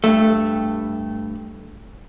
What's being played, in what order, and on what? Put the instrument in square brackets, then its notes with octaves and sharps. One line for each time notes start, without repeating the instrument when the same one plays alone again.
[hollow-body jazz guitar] G2 A3